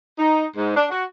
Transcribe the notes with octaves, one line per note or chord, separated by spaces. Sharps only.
D#4
G#2
D4
F#4